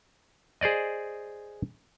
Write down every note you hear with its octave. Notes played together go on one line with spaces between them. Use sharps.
G#4 C5 D5 D#5